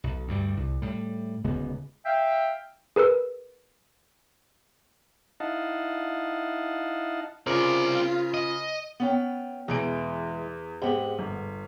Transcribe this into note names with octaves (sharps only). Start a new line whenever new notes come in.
B1
D2 G2 G3
C2
A2 G3
D1 C#3 G#3 B3
E5 F5 G5
G#4 A#4 B4 E6
D#4 E4 D#5 F5 F#5 A5
C#3 C4 F4 A#4 C5 D5
D#5
B3 C#4 G5
E2 B2 E3 G#3 D7
G#2 G#3 B3 C4 G4
G1